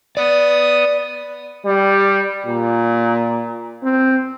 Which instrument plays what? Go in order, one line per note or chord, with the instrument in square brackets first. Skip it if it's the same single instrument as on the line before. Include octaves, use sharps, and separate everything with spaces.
[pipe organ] B3 D#6 [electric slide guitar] D5
[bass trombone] G3
A#2
C4